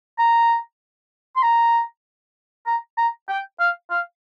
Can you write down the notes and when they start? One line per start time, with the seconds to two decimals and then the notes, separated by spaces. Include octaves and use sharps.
0.19 A#5
1.36 C6
1.43 A#5
2.67 A#5
2.98 A#5
3.29 G5
3.60 F5
3.91 F5